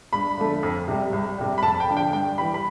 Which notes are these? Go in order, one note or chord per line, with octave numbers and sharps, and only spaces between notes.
G2 B5
D3 F3 A3
F2
C3 G3
C2
C3 G3
B5
F2 A5
G5
D3 F3
G5
G2 G5
E3 G3 B5
B5